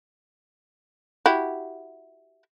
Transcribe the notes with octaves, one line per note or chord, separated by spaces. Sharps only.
E4 F#4 G4